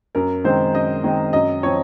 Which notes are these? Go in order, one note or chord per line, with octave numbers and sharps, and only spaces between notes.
F#2 A#4
D#3 G#3 C4 C5
F#2 D#5
D#3 G#3 C4
F#2 D#5
F3 C4 C#5